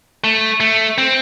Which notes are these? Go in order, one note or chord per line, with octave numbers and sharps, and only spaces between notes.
A3
A3
C4